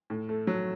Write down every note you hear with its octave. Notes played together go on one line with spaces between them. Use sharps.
A2
A3
F#3